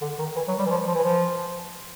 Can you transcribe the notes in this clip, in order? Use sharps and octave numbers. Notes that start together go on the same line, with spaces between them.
D3
D#3
E3
F#3
G3
E3
F3
F3
E3
F3